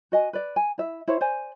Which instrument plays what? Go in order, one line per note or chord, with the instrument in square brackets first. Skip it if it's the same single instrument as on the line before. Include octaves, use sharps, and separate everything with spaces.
[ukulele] F#4 D#5 G#5
B4 D5
G#5
E4 E5
E4 C5 C#5
C5 D5 G#5